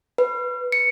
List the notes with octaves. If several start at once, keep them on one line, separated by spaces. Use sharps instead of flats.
B4
C#7